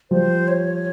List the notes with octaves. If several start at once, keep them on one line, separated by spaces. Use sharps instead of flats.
F3 G3 C5
C#5